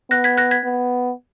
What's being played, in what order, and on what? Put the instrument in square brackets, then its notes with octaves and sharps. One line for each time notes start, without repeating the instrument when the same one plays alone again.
[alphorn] B3 [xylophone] F#6 A#6
[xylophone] G#6 B6
F#6 A#6
G#6 B6
[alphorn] B3